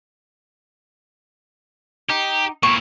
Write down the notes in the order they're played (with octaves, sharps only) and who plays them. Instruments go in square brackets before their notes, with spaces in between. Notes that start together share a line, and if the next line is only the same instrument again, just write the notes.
[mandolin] D#4 [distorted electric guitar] G4
[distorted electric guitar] A#2 E4 [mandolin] C#6